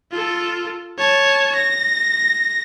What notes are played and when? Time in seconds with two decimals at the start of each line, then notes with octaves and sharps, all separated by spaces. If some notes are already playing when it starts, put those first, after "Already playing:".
0.11 F4 A4
0.99 C#5 A5
1.55 A#6